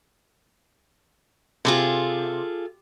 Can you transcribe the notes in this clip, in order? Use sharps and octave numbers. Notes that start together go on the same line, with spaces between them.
C3 F4 G#4 A4